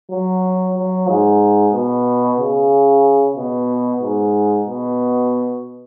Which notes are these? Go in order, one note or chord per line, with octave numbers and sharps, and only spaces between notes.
F#3
F#3
G#2
B2
C#3
B2
G#2
B2